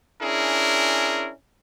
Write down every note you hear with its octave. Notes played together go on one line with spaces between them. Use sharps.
C#4 D4 E4 G#4 A#4